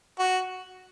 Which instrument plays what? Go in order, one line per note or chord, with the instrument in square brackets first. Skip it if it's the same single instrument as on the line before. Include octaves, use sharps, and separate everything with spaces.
[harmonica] F#4